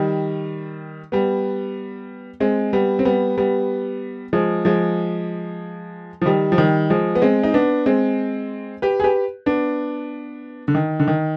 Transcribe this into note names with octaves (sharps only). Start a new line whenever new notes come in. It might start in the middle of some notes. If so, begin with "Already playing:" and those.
Already playing: D#3 G3
G3 B3
G#3 C4
G3 B3
C4
G3 B3
G3 B3
F3 G#3
F3 G#3
F3
D#3 G3
F3
D#3 G3
F3 G#3
B3
G#3 C4
D#4
B3 D4
G#3 C4
G4 B4
G#4
G4 B4
B3 D4
D3
D#3
D3
D#3